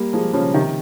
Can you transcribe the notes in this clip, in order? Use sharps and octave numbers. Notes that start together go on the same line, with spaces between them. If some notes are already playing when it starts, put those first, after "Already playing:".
Already playing: G3 A#3
F3 G#3
C#3 F3
C3 D#3